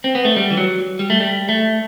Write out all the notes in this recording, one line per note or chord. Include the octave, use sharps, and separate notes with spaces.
C4
B3
A3
G3
E3
F#3
G3
A3
G3
A3